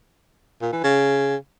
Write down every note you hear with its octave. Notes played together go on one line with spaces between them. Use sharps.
A#2
E3
C#3